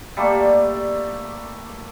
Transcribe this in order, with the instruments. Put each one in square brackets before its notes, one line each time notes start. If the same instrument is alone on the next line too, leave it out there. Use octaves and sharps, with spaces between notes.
[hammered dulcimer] G3 A3 A#3 D5